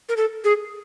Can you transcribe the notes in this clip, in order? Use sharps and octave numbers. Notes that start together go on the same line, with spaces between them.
A#4
A4
G#4